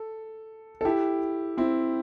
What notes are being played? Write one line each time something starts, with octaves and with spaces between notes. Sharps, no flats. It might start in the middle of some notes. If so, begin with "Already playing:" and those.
Already playing: A4
A4
E4 G4
C4 E4